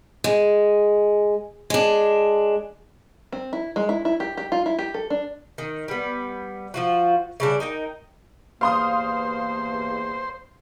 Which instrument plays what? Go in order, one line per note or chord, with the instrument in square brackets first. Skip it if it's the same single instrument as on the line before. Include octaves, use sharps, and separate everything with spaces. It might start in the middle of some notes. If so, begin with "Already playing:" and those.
[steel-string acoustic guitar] G#3
G#3 D4
[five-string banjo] C4
E4
G#3
E4
E4
G4
G4
F4
E4
G4
A4
D4
[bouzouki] D#3
G3 B3
F3 F4 F#4
C#3 G3 D4
D#4 A#4 G5
[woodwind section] E2 G2 A#3 [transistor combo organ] C5 [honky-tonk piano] F5 C6 D#6